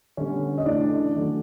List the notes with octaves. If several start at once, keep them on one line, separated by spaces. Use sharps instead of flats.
D3 G3 B3 C#4 C#5
D#5
C#3 E3 A3 C#4 D4 D5
D#3 F#3 A3 C#4